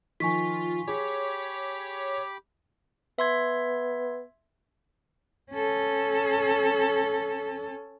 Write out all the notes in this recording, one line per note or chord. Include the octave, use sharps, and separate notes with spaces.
D#3 F3 F4 G#5 C#6 B6
G4 G#4 C#5 B5 D6
B3 E5 C6 G#6
C#4 A4